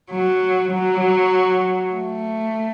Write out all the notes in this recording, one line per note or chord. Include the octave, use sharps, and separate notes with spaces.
F#3
F#3
A3